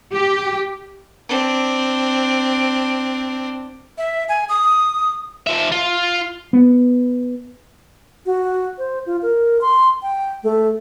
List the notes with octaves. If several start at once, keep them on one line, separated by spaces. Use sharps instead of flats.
G4
C4 D4
E5
G#5
D#6
F3 E5
F4
B3
F#4
C5
F4
A#4
C6
G5
A3